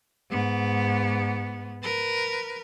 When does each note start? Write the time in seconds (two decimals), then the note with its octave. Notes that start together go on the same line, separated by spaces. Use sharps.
0.30 G#2 B3
1.83 A#4 B4